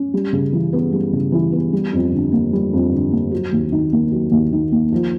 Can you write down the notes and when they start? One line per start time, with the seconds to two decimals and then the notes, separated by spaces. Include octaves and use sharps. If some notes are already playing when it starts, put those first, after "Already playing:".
Already playing: C#4
0.14 G3
0.33 C#3
0.53 E3
0.73 B3
0.92 G3
1.13 C#3
1.32 E3
1.52 B3
1.73 G3
1.93 F2
2.12 D3
2.32 A#3
2.53 G3
2.73 F2
2.92 D3
3.12 A#3
3.32 F#3
3.52 D#2
3.72 D#3
3.92 A#3
4.12 F#3
4.31 D#2
4.52 D#3
4.72 A#3
4.92 F3